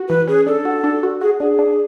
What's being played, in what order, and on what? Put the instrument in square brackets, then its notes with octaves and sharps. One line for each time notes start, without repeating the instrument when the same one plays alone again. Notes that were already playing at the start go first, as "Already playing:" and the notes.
Already playing: [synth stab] F#4
[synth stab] E3 [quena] B4
[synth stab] C#4 [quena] G#4
[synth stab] D4 [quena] A4
[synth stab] F#4
D4
F#4
[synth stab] F#4 [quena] G#4
[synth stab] D4 [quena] G#4
[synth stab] D4